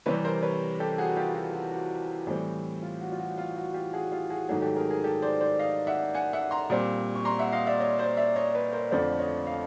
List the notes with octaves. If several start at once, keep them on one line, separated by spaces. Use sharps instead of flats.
C3 E3 G3 C4 B4 C#5
A#4 C5
B4 C#5
G4 A4
F#4 G#4
F4 G4
F#4
F#4
F#4
A2 E3 G3 C4
F4
F#4
F4
F#4
F4
F#4
F4 G4
F#4 G#4
F4 G4
F#4 G#4
G#2 D#3 F#3 A3 F#4 G#4
G4 A4
G#4 A#4
G#4 A#4
G4 A4
C5 D5
C5 D5
D#5 F5
E5 F#5
F#5 G#5
E5 F#5
A#5 C6
A#2 G3 C4
C#6
A#5 C6
E5 F#5
D#5 F5
D5 E5
C#5 D#5
C5 D5
D5 E5
C#5 D#5
B4 C#5
A#4 C5
F2 D3 F3 A3 C4 C5 D5
C#5 D#5
D#5 F5